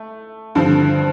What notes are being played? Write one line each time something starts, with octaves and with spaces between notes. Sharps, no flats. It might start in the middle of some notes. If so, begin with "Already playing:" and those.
Already playing: A3
G2 D3 F3 C4